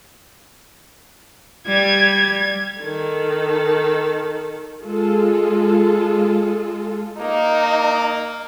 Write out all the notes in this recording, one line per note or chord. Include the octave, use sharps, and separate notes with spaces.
G3 G#6
D#3 A4
G#3 F4 A4
A#3 D#4